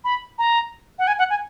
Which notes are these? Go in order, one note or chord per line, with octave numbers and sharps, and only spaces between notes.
B5
A#5
F#5
G#5
F#5
G#5